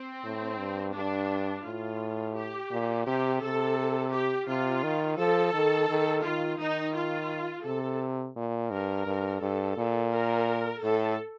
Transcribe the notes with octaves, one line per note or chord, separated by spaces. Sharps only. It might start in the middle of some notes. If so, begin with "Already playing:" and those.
Already playing: C4
A2
G2
G2 D4
A2 F4
G4
A#2
C3 G4
C3 A4
G4
C3 F4
D#3
F3 A4
D#3
D#3
D#3 F4
D#3 D#4
F4
C3 A4
A#2
G2 A#4
G2
G2 A4
A#2
A#4
A2 A4